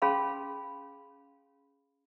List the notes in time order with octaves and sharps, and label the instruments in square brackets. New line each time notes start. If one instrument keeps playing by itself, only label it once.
[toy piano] C#4 G#4 F5 A5 B5 C6